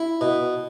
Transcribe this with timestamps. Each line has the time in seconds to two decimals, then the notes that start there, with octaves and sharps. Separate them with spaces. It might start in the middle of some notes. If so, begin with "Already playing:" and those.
Already playing: E4
0.21 B2